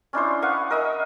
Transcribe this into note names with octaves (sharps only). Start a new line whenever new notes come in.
C#4 D4 E4 C5
F5 F#5 C#6 D#6
A#4 D#5 E5